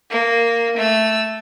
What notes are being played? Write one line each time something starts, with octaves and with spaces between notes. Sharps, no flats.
A#3
A3 E6